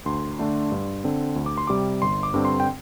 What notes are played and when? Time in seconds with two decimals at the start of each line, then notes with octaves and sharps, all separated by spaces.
0.06 D2 C6
0.39 D3 A3 D4
0.72 G2
1.04 D3 C4
1.36 D2
1.46 D6
1.58 C6
1.67 C3 G3 D6
2.02 G1 C6
2.23 D6
2.34 G2 D3 C4
2.45 C6
2.60 G5